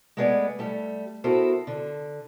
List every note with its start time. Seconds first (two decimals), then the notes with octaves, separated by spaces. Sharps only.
0.17 G#3 A3 B3 G#4 D5
0.59 G3 A3
1.24 B3 E4 F#4 A4 A#4 C5
1.67 D3